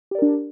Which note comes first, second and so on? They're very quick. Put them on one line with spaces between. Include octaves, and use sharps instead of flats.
G4 D5 A#4 D4